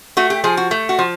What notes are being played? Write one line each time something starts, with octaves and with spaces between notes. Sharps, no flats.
A3 F#4
G4
F3 G#4
F#4
A3
F#4
F3